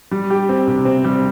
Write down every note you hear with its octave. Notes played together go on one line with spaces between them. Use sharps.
G3
G4
C4
C3
C4
G3